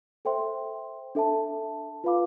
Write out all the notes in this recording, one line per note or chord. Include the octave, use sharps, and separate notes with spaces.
A4 C5 E5 G5 C6
D4 A4 E5 A5
F4 B4 F5 B5 D6